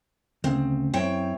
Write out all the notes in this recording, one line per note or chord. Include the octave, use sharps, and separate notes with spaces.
D2 C#3 C4
F#2 C4 E4 C#5 G5